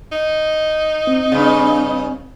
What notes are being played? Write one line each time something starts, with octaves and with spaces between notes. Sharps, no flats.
D#4
C4
G2 C#3